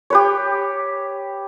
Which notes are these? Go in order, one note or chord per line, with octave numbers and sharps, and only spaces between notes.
G4 B4 C#5